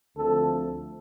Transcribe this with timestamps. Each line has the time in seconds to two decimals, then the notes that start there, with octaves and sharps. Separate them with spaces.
0.15 D2 D3 F3 A3 C4 A4